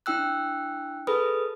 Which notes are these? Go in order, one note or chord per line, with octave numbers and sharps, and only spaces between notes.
D4 E4 G5 E6 F#6
G#4 A4 B4 B5 D#6